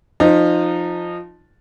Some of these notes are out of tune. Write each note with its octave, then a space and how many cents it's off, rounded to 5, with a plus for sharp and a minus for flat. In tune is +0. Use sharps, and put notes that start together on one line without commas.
F3 +0 D#4 -20